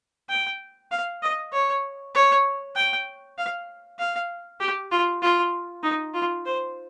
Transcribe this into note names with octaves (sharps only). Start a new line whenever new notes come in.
G5
F5
D#5
C#5
C#5
G5
F5
F5
G4
F4
F4
D#4
F4
C5